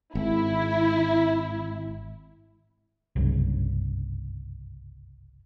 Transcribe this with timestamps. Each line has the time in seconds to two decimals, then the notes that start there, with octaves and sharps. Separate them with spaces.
0.15 G#1 E4
3.16 F#1 C2 G2 C#3